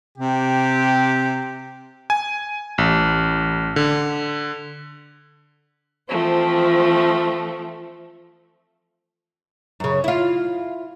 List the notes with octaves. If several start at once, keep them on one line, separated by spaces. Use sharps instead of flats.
C3 G4
G#5
A1
D3
E3 F3 A3 C4
F#2 C#3
E4 F4